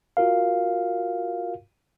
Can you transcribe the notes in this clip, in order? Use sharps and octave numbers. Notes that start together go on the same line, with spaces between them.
F4 F#4 A#4 F5